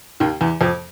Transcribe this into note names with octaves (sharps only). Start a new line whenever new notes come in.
D#2 D#3
E2 E3
F2 F3